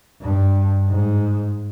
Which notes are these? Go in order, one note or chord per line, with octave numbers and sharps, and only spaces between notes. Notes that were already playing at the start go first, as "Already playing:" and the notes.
G2
G#2